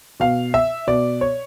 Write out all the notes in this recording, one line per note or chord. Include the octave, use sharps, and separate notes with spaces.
B2 F5
E5
B2 D5
C#5